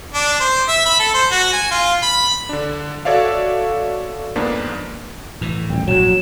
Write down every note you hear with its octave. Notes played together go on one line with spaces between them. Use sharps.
D4
C5
E5
B5
A4
C5
F#4
G#5
F4
B5
D3 D4
F#4 A4 C#5 D5 E5 F5
F2 G#2 A#3 B3 D4
A2 E3
D#1 A1 G5
A#1 G#2 F#3 E7